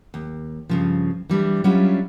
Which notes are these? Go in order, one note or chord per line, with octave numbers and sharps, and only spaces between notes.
D#2
G2 C#3 F3
E3 G3 D4
F#3 G3 C#4 D4 E4 F4